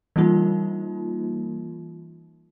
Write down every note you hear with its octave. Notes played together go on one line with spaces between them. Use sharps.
E3 G3 A#3 D#4 F4